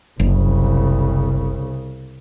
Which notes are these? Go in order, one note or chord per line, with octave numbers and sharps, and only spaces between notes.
F#1 C2 C#3